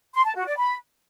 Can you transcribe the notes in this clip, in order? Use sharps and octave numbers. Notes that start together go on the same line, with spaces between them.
C6
A5
F#4
D5
B5